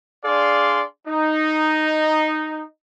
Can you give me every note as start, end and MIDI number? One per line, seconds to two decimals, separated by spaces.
0.25 0.81 62
0.25 0.81 68
0.25 0.81 74
0.25 0.81 77
0.25 0.81 84
1.08 2.63 63